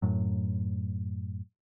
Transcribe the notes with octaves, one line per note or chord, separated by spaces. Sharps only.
F#2 A2 F#3